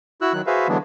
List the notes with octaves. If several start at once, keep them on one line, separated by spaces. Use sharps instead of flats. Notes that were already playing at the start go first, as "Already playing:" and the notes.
E4 F#4 E6 F#6
D#3 F#3 F#6
F#4 G#4 B4 C5 E5 F5
D3 E3 F#3 G#3 B3 D4